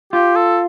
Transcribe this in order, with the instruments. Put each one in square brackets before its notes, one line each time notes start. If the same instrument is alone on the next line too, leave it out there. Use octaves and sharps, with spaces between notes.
[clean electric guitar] F4 [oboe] G4
[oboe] A4